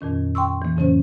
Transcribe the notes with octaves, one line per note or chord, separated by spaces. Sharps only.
F2 A#2 D#3 C#4
G5 C6 C#6 E6
E3 A#3
F2 A2 C#3 F#3 C#4 C5